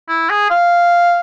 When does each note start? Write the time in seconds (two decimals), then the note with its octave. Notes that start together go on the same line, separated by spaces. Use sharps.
0.09 E4
0.30 G#4
0.51 F5